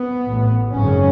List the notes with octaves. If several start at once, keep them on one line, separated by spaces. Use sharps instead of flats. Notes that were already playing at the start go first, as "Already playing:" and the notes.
Already playing: B3
A1 A2
G#1 F#2 C#3 C#4